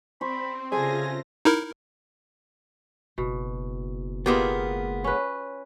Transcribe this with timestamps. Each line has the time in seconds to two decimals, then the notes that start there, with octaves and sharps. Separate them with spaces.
0.21 C4 C5 B5 C#6
0.72 C#3 F4 G#4 A4 C5 E5 G#5 A#6
1.45 D#4 E4 A#4
3.18 F#1 B2
4.26 G#3 A#3 B3 F4 G4
5.04 C#4 B4